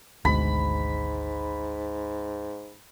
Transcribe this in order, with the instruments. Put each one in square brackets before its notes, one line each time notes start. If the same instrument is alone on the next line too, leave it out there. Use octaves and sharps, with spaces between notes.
[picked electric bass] G#1 B2 G#3 [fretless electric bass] D2 [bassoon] G#2 [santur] B5